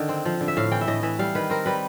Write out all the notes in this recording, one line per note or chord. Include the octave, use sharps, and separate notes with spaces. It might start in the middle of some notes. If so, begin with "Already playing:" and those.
Already playing: D3 D#3
C4
F3
D3
E5
A2 F5
E3 G5
E5
A2 D#5
E3 E5
G3 F5
D#3 B4
C4 A#4
G3 B4